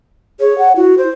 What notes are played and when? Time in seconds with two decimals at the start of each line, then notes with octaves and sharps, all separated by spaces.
0.40 G#4 C#5
0.58 F#5
0.76 E4 F#4
0.98 C5